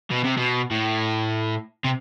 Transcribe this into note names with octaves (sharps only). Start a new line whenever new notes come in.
B2
C3
B2
A2
C3